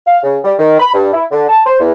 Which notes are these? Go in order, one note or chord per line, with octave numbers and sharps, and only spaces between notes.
F5
C#3
G3
D#3
B5
G2
E4
D3
A5
C5
E2